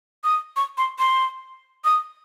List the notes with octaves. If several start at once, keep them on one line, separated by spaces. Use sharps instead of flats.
D#6
C#6
C6
C6
D#6